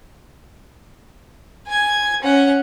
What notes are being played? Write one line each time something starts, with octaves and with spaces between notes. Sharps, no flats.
G#5 G#6
C#4 F#5